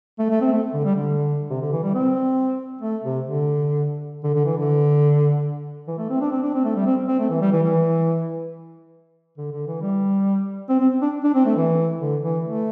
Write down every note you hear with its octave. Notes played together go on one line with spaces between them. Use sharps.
A3
A3
C4
A3
D3
G3
D3
C3
D3
E3
G3
C4
A3
C3
D3
D3
D3
E3
D3
E3
A3
C4
D4
C4
D4
C4
A3
G3
C4
C4
A3
E3
G3
E3
E3
D3
D3
E3
G3
C4
C4
D4
D4
C4
A3
E3
D3
E3
A3